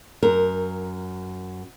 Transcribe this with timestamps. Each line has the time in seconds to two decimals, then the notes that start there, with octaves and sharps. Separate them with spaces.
0.23 F#2 A#4